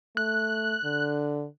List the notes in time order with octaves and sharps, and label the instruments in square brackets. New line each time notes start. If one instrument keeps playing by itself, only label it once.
[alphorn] A3 [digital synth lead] F#6
[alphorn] D3